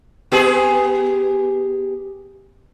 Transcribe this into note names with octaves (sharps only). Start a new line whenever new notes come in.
B3 G4 G#4